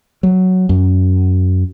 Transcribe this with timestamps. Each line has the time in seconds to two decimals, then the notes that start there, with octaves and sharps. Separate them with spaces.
0.23 F#3
0.69 F#2